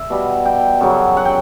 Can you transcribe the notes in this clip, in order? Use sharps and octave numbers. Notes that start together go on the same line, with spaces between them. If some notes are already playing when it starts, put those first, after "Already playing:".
Already playing: E5
B2 G3
G5
F#2 C#3 F#3
F#5
G5